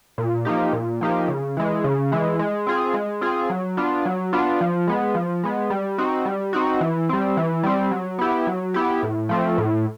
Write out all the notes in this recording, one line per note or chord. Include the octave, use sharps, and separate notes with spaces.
A#2
F3 A#3 D#4 G4
A#2
F3 A#3 D#4 G4
C#3
E3 G#3
C#3
E3 G#3
G#3
C4 F4 G#4
G#3
C4 F4 G#4
F#3
B3 D4 F4
F#3
B3 D4 F4
F3
G#3 B3
F3
G#3 B3
G3
C4 D#4 F#4
G3
C4 D#4 F#4
E3
G3 C4
E3
G3 C4
F#3
B3 E4 G4
F#3
B3 E4 G4
A2
F3 A3 C4
A2